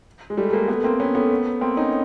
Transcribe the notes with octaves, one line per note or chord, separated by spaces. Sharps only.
G#3
G3 A3
A3
G#3 A#3
A3 B3
A#3 C4
B3 C#4
A3 B3
A#3 C4
C#4 D#4